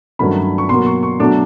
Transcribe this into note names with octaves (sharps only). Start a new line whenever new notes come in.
G2 D#3 F#3 A3 C#4 B5
C#6
B2 F#3 A#3 C6
C#6
C#6
B2 F#3 A3 D4 D6